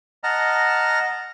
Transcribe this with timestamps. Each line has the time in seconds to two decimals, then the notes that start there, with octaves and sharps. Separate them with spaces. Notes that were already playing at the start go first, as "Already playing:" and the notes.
0.24 D#5 F#5 A5 A#5 F6